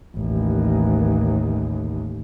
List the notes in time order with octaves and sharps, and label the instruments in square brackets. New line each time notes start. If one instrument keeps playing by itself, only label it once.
[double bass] A1 D#2